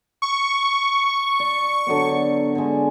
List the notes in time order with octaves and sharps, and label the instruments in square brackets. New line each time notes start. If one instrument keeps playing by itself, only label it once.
[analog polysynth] C#6
[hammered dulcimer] D5
D3 F#3 B3
D3 G#3